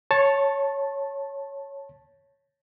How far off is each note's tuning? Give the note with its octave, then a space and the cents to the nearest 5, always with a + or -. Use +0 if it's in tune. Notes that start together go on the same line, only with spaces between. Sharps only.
C#5 +0 A5 +0 C#6 -35